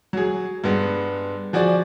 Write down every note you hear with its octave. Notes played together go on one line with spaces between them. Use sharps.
F#3 G#4
G2 G#3 B3
F3 F#4 G#4 D5